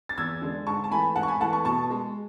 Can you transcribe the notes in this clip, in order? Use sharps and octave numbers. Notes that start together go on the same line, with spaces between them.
A6
E2 E6 G#6
D3 G#3
G#2 A5 C#6
A5
E3 A3 G#5 B5
G#2 F#5 A5
C#6
G#5 B5
E3 A3 F#5 A5
A5 C#6
B2 A5 C#6
G#3